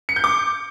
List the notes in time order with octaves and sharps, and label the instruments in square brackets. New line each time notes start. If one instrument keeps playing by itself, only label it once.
[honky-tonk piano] C#7
G6
D6